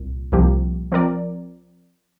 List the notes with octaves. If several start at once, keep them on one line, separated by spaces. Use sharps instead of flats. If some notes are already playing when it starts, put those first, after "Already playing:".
Already playing: C2 A#2
C2 A#2 F3 A#3 G4
F3 C4 A#4 D5